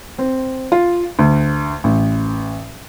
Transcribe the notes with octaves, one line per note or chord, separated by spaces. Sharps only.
C4
F4
D2
A1